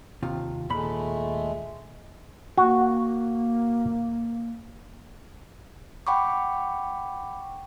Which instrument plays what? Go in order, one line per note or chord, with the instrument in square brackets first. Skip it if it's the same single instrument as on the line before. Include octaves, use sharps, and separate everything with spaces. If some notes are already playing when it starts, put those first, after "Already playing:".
[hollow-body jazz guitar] D#2 C3 F4
[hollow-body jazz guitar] D#2 A#2 B5 [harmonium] G#3 A3
[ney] A#3 [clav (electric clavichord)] F#4
[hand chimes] F#5 G5 B5 C#6 D6